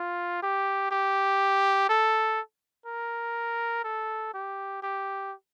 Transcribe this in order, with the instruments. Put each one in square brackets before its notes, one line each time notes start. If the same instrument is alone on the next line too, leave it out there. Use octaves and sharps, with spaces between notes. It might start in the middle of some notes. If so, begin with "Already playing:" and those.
Already playing: [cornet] F4
G4
G4
A4
A#4
A4
G4
G4